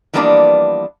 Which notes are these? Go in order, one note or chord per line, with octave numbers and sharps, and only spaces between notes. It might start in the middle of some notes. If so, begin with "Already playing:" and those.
E3 F3 G3 A#3 B3 D4